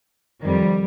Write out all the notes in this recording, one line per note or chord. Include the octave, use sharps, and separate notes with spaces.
F2 D#3 G3